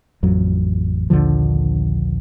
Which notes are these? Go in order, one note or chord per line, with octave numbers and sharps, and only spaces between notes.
A1 F2 F#3
A#1 D#2 D3 F3